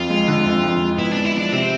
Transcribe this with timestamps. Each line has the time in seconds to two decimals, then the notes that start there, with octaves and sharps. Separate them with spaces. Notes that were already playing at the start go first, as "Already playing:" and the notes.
Already playing: F2 F4
0.10 G#3
0.28 D3
0.46 F2
0.64 F2
0.81 G#3
0.99 B3 E4
1.12 D4
1.17 G#3
1.25 E4
1.35 F3 D4
1.53 C3 C4